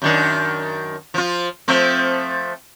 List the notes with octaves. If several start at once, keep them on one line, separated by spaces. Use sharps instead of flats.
F#2 D#3 D4
F3 F4
F3 A3 C4